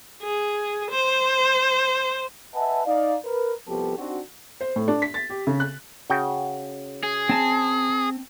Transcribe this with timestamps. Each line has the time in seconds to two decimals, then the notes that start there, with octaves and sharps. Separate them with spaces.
0.22 G#4
0.91 C5
2.55 B4 D#5 E5 F#5 G#5 A5
2.86 D#4 D5 F5
3.25 A#4 B4
3.68 C2 F3 B3 G4 A4
3.98 C4 D4 D#4 F#4
4.61 C5
4.76 A2
4.88 D4
5.02 B6
5.14 A6
5.30 G4
5.47 C#3
5.60 F#6
6.10 C#3 F#4 G5
7.03 G#4
7.29 C4 A5